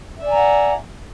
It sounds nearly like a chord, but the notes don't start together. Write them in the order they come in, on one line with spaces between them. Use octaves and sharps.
E5 D5 G#5 A#5 F#5